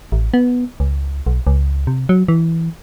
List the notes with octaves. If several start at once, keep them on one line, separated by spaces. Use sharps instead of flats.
A1
B3
C#2
B1
C#2
C3
F#3
E3